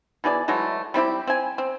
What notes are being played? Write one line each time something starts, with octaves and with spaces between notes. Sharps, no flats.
B2 E3 G#4 D5
E3 F#3 G#3 A3
G3 C4 E4 G4
C4 G#5
C4